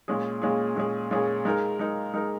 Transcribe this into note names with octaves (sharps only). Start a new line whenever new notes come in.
A#2 G#3 C#4 G#4
A#2 G#3 C#4 G#4
A#2 G#3 C#4 G#4
A#2 G#3 C#4 G#4
G#3 D#4 A#4
G#3 D#4 A#4
G#3 D#4 A#4